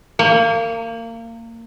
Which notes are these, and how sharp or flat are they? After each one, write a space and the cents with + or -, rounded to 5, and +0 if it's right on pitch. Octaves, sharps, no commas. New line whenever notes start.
A#3 -25